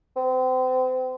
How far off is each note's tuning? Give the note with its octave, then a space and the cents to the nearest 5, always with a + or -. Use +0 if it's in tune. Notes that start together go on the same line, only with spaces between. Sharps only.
C4 -35